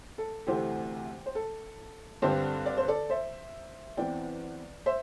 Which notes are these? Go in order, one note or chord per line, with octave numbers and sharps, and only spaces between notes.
A4
D2 C3 E3 A3 C4 G4 C5
C5
A4
G2 D3 C4 G4 C5
D5
C5
A4 D5
C5 E5
E2 E3 C4 D5 G5
C5 E5